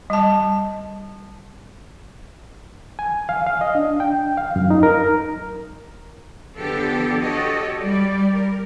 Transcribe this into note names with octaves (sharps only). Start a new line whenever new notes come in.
G3 A5
G#5
F5
F5
D#5
D4
G5
F5
F#2
D#4
A#4
D3 F3 B3 D4 G4 A4
F#4 G4 A4 C#5 D#5
G3 D5
A#4